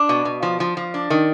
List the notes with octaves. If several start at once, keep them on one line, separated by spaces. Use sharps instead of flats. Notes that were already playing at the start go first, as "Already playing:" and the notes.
Already playing: D4
B2
B2
F3
F3
F3
D4
D#3